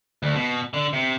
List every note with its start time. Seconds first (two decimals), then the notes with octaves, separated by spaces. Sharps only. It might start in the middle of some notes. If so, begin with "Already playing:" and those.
0.23 D2
0.35 B2
0.74 D3
0.93 C3